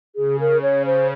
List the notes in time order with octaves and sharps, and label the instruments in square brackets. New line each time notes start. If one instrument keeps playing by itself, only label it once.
[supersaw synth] C#3 [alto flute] G#4
[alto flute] A#4
[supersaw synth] C#3
[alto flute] C#5
[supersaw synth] C#3
[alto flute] C5